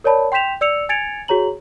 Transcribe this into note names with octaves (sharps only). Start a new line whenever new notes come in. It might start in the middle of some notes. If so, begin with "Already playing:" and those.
A#4 C#5 D5 A5 B5
G5 C6 G6 B6 E7 F7
D5 E6 C#7 F7
G#5 G#6 A6 C#7 D7 F7
F#4 G#4 C#5 A#5 F#7